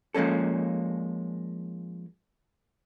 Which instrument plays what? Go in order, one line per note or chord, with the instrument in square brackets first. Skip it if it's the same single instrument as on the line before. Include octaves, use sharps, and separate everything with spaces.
[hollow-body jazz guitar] F3 G#3 A#3 C#4 A4